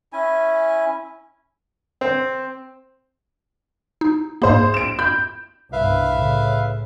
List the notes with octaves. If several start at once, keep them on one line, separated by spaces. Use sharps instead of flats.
C#4 E4 G#5
C4
D#4
G#2 A#3 G#4 C5
D7 E7
B5 G6
C2 G2 B2 B4 E5 F5
A2 C#3